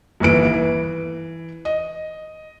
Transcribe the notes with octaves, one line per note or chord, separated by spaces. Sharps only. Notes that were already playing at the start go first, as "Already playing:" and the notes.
G1 D#2 E3 D7
E3
D#5